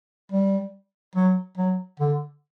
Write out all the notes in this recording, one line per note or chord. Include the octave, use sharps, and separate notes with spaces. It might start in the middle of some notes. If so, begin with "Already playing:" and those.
G3
F#3
F#3
D3